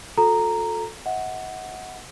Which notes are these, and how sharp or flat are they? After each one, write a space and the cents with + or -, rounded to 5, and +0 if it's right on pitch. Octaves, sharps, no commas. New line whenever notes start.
F#4 -45 A4 +0 A#5 -5
D#5 +45 F#5 +0